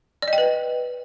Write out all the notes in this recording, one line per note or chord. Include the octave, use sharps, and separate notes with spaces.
D5
D#5
G5
B4